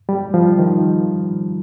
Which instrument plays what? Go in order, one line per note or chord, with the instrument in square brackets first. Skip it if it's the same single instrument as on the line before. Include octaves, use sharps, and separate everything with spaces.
[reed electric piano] G3
F3
D#3